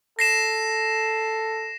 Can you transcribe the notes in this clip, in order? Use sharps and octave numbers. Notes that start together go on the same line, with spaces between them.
A4 A#6 C7 E7